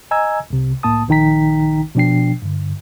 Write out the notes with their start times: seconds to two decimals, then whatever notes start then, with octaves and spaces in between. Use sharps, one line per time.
0.11 D#5 G#5 A#5 E6 G#6
0.50 C2 C3
0.83 C2 A2 A#3 A5 D#6
1.08 A#1 D#3 D#4 G5 A#5 B6
1.95 B2 F3 D4 G5 C7
2.42 G2 D3